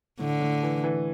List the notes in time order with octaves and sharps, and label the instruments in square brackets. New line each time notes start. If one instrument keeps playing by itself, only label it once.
[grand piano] A2 [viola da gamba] D3
[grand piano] A2
E3
E3